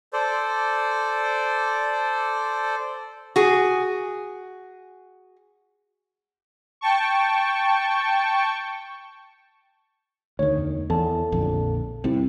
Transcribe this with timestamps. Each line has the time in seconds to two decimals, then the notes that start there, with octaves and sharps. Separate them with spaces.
0.13 A4 C5 D5
3.36 F#4 G#4
6.81 G5 A5 C#6
10.39 D2 D#3 C#5
10.58 E2
10.90 E2 A4 A5
11.32 A#1 F2 D3
12.04 C2 C3 C4 E4